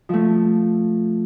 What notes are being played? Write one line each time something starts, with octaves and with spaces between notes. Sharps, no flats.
F3 A3